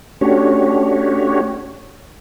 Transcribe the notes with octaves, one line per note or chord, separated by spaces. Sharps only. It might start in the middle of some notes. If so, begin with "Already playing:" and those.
A3 C#4 D4 F#4 G4 C#5